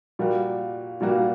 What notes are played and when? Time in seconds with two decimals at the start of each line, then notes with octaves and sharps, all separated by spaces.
0.19 A#2 G3 A#3 F#4
1.01 A#2 G3 A#3 F#4